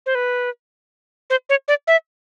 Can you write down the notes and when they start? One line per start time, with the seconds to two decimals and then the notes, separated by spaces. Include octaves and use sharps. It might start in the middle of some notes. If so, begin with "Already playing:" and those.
0.06 C5
0.15 B4
1.30 C5
1.49 C#5
1.68 D5
1.87 E5